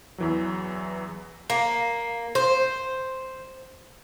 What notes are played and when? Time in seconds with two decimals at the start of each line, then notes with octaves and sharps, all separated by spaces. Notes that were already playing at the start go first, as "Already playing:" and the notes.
0.18 E2 E3 F#3
1.50 A#3
2.35 C5